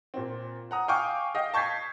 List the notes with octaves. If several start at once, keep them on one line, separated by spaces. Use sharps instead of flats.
A#2 C4
F#5 A#5 D#6
F5 G5 G#5 C#6 D6 F6
D#5 F5 G5
A5 C#6 G6 G#6 B6 C7